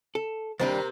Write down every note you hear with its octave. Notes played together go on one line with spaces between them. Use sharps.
A4
D#2 C3 G3 A#3 D4 C5